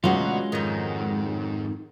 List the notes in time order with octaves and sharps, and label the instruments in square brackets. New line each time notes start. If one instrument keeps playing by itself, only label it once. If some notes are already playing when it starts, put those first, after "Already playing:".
[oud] D2 B2 [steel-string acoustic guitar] F#3 C#4 F#5 [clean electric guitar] G#3 F4 [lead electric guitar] F#4
[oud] F2 D#3 [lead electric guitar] G#2